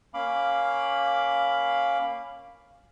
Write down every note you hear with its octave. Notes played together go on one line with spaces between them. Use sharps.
A#3 C#4 F5 B5 D6